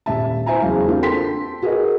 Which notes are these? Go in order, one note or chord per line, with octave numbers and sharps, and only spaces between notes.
D#1 E5 A5
E4 C5 E5 G#5 A#5
E2 C#3 F#3 F5
A#3 C4 D4 F4 G4
A4 G5 C6 B6
F#4 G#4 A#4 B4 D#5